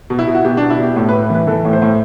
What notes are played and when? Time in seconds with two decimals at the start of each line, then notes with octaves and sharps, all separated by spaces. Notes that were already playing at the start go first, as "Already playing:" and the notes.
0.10 B2
0.19 E4
0.27 B2
0.35 F#4
0.44 B2 G4
0.57 B2 D4
0.70 E4
0.79 B2 G4
0.96 A2
1.09 A2 B4
1.30 E3 B4
1.47 E3 A4
1.65 A2
1.73 C5
1.82 A2